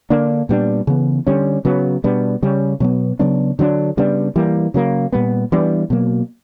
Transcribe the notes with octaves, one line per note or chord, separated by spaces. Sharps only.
D3 A#3 D4
A#2 G3 B3 D4
C#3 E3 B3
D3 G3 C#4
C#3 F#3 B3
B2 G3 B3 D4
C#3 G3 C#4
B2 F#3 B3
C#3 F#3 B3 D4
D3 F#3 B3 D4
C#3 G3 B3 D4
E3 G3 A#3
C#3 F#3 A#3
A#2 G3 B3
E3 G3 B3 D4
B2 F#3 A#3